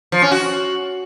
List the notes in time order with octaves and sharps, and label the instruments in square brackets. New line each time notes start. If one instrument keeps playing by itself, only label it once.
[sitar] F3
C#4
F#4